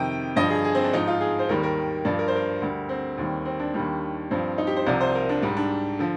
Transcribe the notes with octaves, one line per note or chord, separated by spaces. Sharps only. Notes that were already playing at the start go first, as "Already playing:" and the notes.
Already playing: F2 C3 D#3 G5
G2 D3 F3 D#5
G#4
G#4
C4
D4
G#2 F3 D#4
F4
G#4
C5
D#2 D#3 G3 A#4
A#4
G2 F3 D5
A#4
C5
A#4
D2 D3 G3
C4
D#2 D#3 G3
C4
D4
D#2 D#3 G3
G2 F3 C4
D#4
G4
C5
C2 C3 F3 D5
C5
A#4
D4
G#2 G3
D4
D3 F3